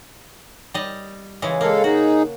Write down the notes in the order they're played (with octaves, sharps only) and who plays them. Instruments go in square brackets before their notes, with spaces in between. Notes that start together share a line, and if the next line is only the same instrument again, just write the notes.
[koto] G3 D#5
C#3 E3 G#3
[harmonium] G#3 A4 F5 [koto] A#3
[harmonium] D#4 G#4 [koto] F#4